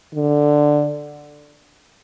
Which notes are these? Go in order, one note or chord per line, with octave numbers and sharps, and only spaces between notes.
D3